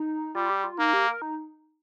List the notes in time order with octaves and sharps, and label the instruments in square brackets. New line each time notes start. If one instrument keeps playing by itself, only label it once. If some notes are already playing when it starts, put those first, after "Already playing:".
Already playing: [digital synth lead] D#4
[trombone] G3 [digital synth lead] F4
[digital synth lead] G4
F4
[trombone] A#3 [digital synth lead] D#4
[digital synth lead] G4
A#4
D#4